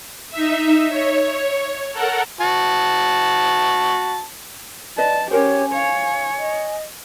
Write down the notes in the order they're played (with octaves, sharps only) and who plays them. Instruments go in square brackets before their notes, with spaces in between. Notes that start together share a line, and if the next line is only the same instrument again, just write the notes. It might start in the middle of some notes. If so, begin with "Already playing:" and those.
[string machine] D#4 E5
C#5
A4 A#4 F#5
[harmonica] F#4 A5
[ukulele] B4 D#5 [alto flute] D5 [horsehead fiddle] A5
[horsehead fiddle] C#4 G4 [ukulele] A#4 C5 [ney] C#5 [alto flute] G#5
[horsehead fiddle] C#5 [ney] F5
[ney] D#5